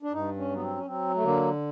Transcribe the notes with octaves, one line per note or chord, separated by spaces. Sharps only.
D4
G2 D#4
C#4
F#3 B3
C4
C#4
F#3 C4
A3
D3 A#3